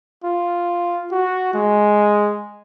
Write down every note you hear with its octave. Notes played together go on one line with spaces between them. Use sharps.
F4
F#4
G#3